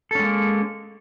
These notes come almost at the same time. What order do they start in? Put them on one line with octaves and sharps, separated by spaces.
A4 C#4 G#3 A#3